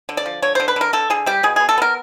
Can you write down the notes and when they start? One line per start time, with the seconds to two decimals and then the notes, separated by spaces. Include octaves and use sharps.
0.09 D3
0.17 D5
0.26 F3
0.42 D3 C#5
0.55 D3 C5
0.68 B4
0.76 D3 A#4
0.93 D3 A4
1.10 D3 G#4
1.26 G3 G4
1.43 B2 G#4
1.56 B3 G#4
1.69 A4
1.78 B3 A#4